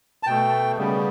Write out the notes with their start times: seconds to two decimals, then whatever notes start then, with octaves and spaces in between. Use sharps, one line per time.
0.23 A5
0.27 B2 A3 G5
0.77 C#3 G3 B3